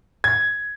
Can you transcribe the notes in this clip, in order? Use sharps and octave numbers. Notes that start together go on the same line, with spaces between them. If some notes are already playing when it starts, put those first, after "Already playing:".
G#6